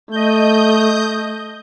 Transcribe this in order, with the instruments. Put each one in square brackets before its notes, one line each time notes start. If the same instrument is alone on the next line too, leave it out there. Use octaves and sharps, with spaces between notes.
[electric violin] A3 [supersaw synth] D#5 G6